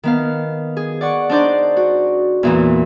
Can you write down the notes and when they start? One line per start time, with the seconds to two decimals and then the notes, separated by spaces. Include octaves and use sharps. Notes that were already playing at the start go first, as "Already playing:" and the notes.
0.03 D#3 B3 F5
0.77 G#4
1.01 D5 F#5 C#6
1.30 D4 D#4 C5 D5
1.77 F#4
2.43 E2 A#2 E3